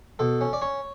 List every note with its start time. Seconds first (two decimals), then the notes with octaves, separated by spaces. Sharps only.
0.19 B2 A4
0.41 C#4
0.53 D5
0.62 C#4 C#5